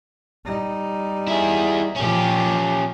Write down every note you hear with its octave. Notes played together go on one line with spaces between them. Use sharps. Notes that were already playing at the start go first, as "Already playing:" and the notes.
G3 D#4
E4 G#4
A#2 F3 C#4 G4